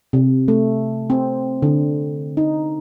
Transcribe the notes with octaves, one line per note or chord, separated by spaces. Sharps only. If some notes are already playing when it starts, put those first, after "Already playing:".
C3
A3
C4
D3
D#4